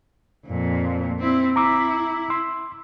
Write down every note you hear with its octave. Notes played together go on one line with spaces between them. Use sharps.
F2 A#2
C4 E4
E4 A#5 D6 E6
C6 E6